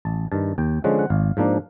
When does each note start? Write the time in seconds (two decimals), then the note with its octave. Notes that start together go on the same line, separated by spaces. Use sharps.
0.05 A1 A5
0.32 G2 D#3 A5
0.58 D#2 G5
0.84 D3 F3 G#3 C#4 F#5
0.99 F#5
1.10 G#1 F5
1.37 G#2 F3 A#3 D4